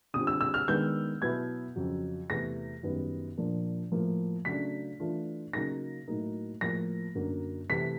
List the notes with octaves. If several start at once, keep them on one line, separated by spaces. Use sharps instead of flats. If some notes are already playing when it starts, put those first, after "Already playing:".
D3 G3 C4 F4 D#6
E6
E6
F6
D#3 G#3 B3 D4 G6
B2 F#3 B3 E4 G#6
F2 C#3 F#3
E2 C3 E3 A3 A#6
F#2 D#3 G3 B3
A#2 F3 A#3 D4
A2 F3 A#3
C#3 F#3 A3 D4 B6
E3 A3 D4 F4
C#3 F#3 A#3 D#4 A#6
A2 F#3 A#3 D#4
A2 F3 A#3 A#6
F#2 D3 F#3 A#3
C3 E3 A3 B6